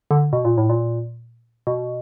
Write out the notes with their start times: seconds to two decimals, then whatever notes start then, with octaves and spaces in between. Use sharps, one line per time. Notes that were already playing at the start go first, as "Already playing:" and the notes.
0.11 D3
0.33 B2
0.45 A#2
0.58 A2
0.69 A#2
1.67 B2